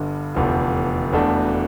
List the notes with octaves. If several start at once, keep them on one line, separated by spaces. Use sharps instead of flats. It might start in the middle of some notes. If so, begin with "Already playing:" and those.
Already playing: G1 G2 D3
F1 E2 D3 F3
E1 E2 B2 A3 D4